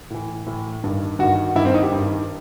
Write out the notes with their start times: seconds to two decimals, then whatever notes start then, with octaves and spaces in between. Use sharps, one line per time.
0.10 A2 E3
0.47 A2 E3
0.84 G2 D#3
1.19 G2 D#3 F#4
1.55 G2 D#3 E4
1.65 C4
1.74 D#4
1.83 G4
1.92 G2 D#3